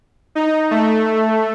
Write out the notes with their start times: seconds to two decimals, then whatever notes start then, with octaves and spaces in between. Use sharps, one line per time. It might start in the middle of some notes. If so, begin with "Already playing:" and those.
0.35 D#4
0.71 A3